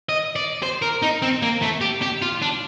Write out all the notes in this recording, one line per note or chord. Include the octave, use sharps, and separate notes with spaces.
D#5
D5
C5
A#4
D#4
C4
A#3
A3
G4
G4
F4
D4